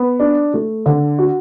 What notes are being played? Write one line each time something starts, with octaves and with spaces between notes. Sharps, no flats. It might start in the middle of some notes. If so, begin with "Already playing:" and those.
Already playing: B3
D4
A3
D3
F#4